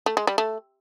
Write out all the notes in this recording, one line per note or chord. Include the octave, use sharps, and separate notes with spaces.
A3
G#3
G3
A3